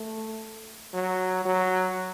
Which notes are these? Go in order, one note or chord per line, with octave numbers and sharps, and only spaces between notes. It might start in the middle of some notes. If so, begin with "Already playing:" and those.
Already playing: A3
F#3
F#3